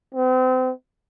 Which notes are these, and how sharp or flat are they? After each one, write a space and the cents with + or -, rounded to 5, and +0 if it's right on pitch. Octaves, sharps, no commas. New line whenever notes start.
C4 -35